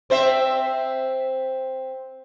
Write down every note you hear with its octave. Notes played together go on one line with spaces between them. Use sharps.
C4 C5 E5